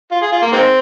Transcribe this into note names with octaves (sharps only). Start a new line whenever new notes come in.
F4
G#4
F4
A#3
D#3 G#3 C4